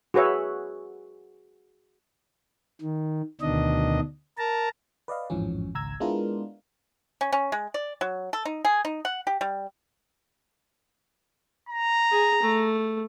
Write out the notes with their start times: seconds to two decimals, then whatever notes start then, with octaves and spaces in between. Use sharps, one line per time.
0.14 F#4 G#4 B4 C#5 E5
2.82 D#3
3.41 D2 B2 D#3 D4 D#5
4.38 A#4 A5 A#5
5.08 B4 D5 D#5 F5
5.30 A1 F2 G#2 E3 F3 C#4
5.75 G#1 C#2 A#5 E6 G#6
6.00 G#3 B3 D4 E4 F4 A#4
7.21 C#4
7.32 C#4
7.52 G#3
7.74 D5
8.01 F#3
8.33 A4
8.45 D#4
8.65 G#4
8.85 D#4
9.05 F#5
9.27 G4
9.41 G3
11.69 A#5
12.11 G#4
12.42 A3